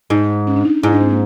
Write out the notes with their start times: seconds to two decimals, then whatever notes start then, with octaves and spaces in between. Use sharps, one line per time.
0.10 G#2 D#4
0.47 C#4
0.56 D4
0.65 D#4
0.83 G#2 E4
0.92 D4
1.02 C4
1.10 A#3